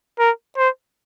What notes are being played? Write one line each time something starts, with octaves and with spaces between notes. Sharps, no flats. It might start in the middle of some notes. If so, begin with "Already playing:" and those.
A#4
C5